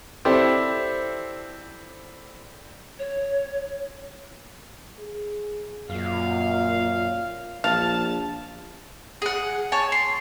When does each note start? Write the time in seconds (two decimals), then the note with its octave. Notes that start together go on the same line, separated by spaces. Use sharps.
0.25 C4 D4 E4 G4 A4 C5
2.99 C#5
5.00 G#4
5.89 F#2 A#2 F5
7.64 A#1 F5 A5
9.22 G#4 F#5
9.72 C#5 G#5 A5
9.92 C6